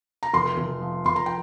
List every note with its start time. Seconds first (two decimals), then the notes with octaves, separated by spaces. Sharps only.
0.23 A#5
0.33 F1 C6
0.57 F1
0.82 F3
1.05 F1 C6
1.16 A#5
1.26 G5